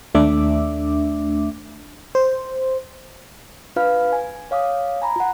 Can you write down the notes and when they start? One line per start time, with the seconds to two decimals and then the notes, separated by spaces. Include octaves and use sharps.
0.14 D#2 A3 D4 E5 D6
2.15 C5
3.76 D4 F4 B4 F5 B5 F6
4.12 G#5
4.51 C#5 F5 D6 D#6
5.02 G#5 A#5 B5
5.16 F4 F#5